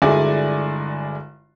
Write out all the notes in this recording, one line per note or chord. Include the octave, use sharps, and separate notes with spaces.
G1 G#3 E4 F#4 D5 G#5